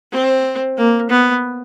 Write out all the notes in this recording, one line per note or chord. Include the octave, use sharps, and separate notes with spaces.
C4
A#3
B3